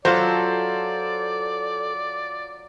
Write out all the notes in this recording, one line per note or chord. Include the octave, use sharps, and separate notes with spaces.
F#3 F4 A4 C5 D5